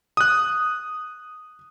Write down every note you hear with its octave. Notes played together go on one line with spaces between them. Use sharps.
D#6 F#6